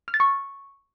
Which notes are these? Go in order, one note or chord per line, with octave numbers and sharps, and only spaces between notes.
F6
A6
C#6